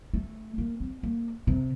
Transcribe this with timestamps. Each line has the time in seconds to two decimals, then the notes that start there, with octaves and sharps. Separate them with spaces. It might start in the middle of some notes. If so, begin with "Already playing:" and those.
0.14 A3
0.58 A#3
0.80 C4
1.03 A#3
1.47 C3